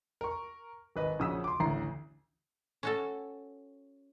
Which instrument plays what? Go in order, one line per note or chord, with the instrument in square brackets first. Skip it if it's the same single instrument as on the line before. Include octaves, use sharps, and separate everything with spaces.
[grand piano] A#4 C#6
G#1 B4 D#5
A#1 C#3 F#4 D#6 E6 B6
C6 D6
A1 D2 A#5 C7
[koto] C#4 F#4 A4